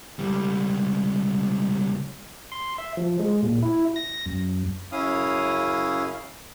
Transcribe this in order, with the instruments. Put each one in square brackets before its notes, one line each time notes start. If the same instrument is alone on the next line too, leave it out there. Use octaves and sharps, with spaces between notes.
[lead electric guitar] C#2 G3
[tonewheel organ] C6
E5
F3
G#3
A#2
E4
A#6
F#2
[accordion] F#2 C#3 C#4 E4 F5 D#6